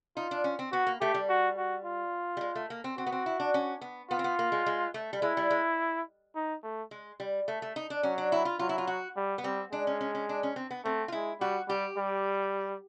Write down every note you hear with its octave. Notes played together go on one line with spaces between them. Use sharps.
D#4 F4
D4
C#4
C4
B3 F#4
A#3
A3 G4
G3
F#4
F#4
F4
G3
G#3
A3
A#3
C4
C4 F#4
B3
C4
E4
D4
C#4
B3
B3 F4
C4
B3
A#3
G#3
G#3
A3
G3
G#3 E4
G3
G#3
D#4
A3
G#3
G3
A3
A3
D#4
D4
F#3 C#4
D4
E4
F4
F#3 F4
E4
F4
F#4
G3
B3
G3 C4
G#3 D4
C#4
C#4
C#4
D4
C#4
C4
B3
A3 C4
F4
G#3 E4
G3 F#4
G3 G4
G3